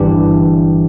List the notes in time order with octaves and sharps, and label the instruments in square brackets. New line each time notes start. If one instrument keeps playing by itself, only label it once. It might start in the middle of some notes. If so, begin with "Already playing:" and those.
Already playing: [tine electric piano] G1 G2 E3 D4 G4